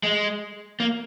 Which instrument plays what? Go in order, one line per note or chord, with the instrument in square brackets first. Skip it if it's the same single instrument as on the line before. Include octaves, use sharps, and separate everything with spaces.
[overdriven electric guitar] G#3
A#3